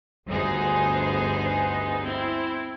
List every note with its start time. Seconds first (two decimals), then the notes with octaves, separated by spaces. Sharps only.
0.28 G1 D2 B3 D#4 G#4 C5
2.04 C4 E4